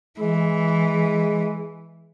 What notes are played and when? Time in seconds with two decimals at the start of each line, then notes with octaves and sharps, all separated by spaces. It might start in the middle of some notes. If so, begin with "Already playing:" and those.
0.20 E3 G#3